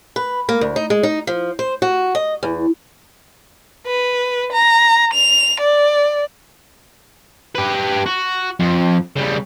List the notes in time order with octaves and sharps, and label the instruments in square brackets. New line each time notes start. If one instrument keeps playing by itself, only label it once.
[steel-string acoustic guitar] B4
A#3
D2
D#4
G#3
D#4
F3
C5
F#4
D#5
E2
[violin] B4
A#5
F7
D5
[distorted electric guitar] G4 B4
F#4
F2
C#3 G3